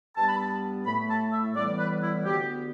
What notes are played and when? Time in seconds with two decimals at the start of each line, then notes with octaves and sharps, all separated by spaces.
0.17 G2 G3 B3 A5
0.28 B5
0.38 A5
0.86 A2 A3 B5
1.10 A5
1.33 E5
1.56 A2 E3 G3 B3 D5
1.79 B4
2.03 E4
2.25 D2 D3 B3 G4